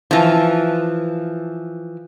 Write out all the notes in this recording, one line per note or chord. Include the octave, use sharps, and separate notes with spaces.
E3 F3